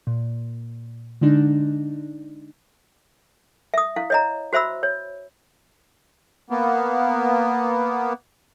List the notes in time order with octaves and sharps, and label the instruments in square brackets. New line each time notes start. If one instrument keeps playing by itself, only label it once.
[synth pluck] A#2
D3 G#3 D4 D#4
[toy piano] E5 D#6
E4 F5
C#5 D#5 A#5
F#4 C5 E5 B5 E6
C#5
[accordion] A#3 B3